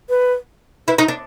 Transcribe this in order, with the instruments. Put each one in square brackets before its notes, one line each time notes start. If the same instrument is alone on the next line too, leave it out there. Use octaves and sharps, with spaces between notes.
[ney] B4
[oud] E4 [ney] B4
[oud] D#4
D4